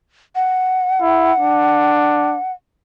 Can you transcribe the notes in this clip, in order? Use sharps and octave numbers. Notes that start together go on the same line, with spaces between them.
F#5
E4
D4